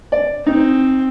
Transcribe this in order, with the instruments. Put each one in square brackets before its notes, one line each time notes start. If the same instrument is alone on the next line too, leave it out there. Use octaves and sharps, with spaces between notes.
[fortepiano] D5
[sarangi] C4 [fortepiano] D#4